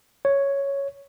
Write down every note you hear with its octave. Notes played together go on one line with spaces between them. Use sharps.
C#5